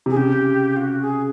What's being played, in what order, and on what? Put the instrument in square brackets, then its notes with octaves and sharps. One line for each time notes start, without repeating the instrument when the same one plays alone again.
[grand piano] C3 [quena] G#4
[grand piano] C#3 [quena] G4
[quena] F4
F#4
G#4